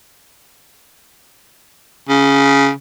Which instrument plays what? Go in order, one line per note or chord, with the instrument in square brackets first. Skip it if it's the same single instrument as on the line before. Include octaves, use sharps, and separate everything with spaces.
[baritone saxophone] C#3